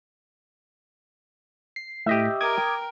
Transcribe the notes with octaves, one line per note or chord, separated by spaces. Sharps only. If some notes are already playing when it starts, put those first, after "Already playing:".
C7
A2 G4 D#5 E5
A#4 G5 D6 D#6 G#6